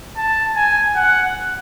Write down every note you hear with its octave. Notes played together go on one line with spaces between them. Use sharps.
A5
G#5
F#5